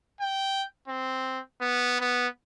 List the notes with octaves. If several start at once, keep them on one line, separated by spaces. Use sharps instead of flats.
G5
C4
B3
B3